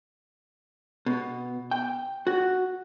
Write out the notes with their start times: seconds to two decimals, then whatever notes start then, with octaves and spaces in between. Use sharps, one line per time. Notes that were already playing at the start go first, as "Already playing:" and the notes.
1.06 B2
1.71 G5
2.27 F#4